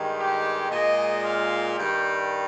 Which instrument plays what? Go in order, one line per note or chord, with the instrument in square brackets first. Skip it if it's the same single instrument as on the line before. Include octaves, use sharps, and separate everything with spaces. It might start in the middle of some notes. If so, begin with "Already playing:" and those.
Already playing: [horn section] G2 D#3 G#3
G4
A#2 G#3 D#5
F5
G2 D#3 G3 G5